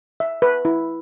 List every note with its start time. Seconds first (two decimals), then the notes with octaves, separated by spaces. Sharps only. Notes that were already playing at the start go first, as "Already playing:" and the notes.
0.20 E5
0.42 B4
0.65 E4